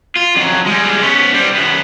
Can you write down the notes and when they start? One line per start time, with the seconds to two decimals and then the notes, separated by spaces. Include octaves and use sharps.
0.16 F4
0.36 F2 F#3
0.66 G3 G#3
1.03 B3 C#4
1.34 G3 C4
1.54 F#2 B3